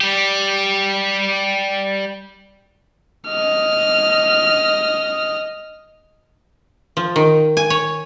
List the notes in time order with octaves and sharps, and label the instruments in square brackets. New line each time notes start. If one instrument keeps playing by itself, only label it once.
[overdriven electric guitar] G3 G4
[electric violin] D#5 F6
[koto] F3
D#3
G#5
C#5